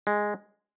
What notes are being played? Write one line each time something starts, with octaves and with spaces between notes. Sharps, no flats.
G#3